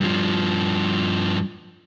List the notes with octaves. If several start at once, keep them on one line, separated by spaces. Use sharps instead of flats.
G2 F3